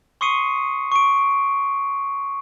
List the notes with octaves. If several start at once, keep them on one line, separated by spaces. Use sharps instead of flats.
C6 C#6 D#6 C7 C#7 D#7
C#6 D7